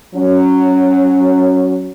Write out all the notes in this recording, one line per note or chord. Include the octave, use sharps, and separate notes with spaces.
F#3 C#4